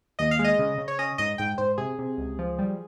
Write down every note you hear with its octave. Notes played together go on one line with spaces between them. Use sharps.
D#2 D#5
F5
G#3
D#5
C#3
C#3
C#5
C#4 D#5
G#2 D#5
G#2 G5
G#2 C5
C3 G#4
C3
C#2
F3
G3